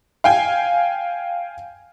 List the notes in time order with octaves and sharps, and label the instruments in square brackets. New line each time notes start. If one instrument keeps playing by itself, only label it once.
[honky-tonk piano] F5 G5 G#5